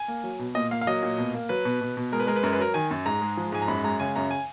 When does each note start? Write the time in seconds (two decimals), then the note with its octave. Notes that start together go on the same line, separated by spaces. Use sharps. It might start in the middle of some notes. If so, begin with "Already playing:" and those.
Already playing: G#5
0.08 A#3
0.24 F#3
0.39 B2
0.55 A#2 D#5
0.71 A#3 F5
0.81 F5
0.87 F#3 D#5
1.03 A#2
1.18 B2
1.34 A#3
1.49 F#3 B4
1.65 B2
1.81 B2
1.97 B2
2.12 G#3 A#4
2.20 B4
2.27 G#3 A#4
2.36 B4
2.43 F#2 A#4
2.53 B4
2.59 F#3 A#4
2.74 D#3 G#5
2.91 F#2
3.06 G#2 A#5
3.22 G#3
3.37 F3
3.52 G#2 G#5
3.62 A#5
3.68 F#2 B5
3.84 G#3 A#5
4.00 C#3 G#5
4.16 F#2 A#5
4.31 G#5